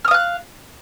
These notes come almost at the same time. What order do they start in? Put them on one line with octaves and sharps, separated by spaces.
F6 D#6 F5 F#6